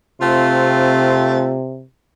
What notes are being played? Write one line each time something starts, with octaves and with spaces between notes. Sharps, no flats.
C3 A3 C4 F4